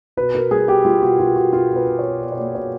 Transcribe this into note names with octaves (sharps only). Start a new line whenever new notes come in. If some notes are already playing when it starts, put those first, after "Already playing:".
B2 B4
B2 A#4
G3 G#4
B2 G4
G3 F4
B2 F#4
B2 F4
B2 F#4
B2 F4
B2
B4
B2
C#5
B2
B2 D5
C#5
A#3 D5
B2 C#5